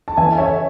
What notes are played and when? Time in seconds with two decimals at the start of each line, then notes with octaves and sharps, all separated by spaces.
0.08 A5
0.17 E3 E5 G#5
0.38 C#3 C#5 E5